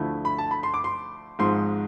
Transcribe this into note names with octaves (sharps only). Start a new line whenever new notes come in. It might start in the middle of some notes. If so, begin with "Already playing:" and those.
Already playing: D2 D3 F3 A3 E4
B5
A5
B5
C6
D6
C6
G#1 G#2 F3 G#3 C6